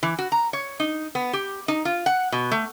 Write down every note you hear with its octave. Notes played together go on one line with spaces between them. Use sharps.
E3
F#4
A#5
C#5
D#4
B3
G4
D#4
F4
F#5
B2
A3